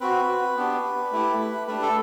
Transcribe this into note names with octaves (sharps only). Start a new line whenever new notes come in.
C4 F#4 B4
B3 D4 G4
A3 E4 G4
A3 D4 G4 B4
A4